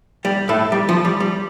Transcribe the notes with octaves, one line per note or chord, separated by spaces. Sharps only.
G3
A2 A3
G3
F3
G3
G3